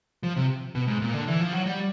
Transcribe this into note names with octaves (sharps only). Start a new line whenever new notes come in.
F3
C3
B2
G#2
A#2
D3
E3
F3
F#3
G3